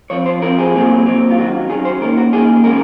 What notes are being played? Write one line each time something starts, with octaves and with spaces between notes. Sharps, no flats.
F3 C4 C#5
C5
F3 C4 A#4
G#4
A#2 F#3 C4
A#2 F#3 C4
F4
D#3 F#3 C#4 F#4
D#3 F#3 C#4 G#4
C5
D#3 A#3 C#4 A#4
F#4
D#3 A#3 C#4 G#4
C#3 G#3 C#4 A#4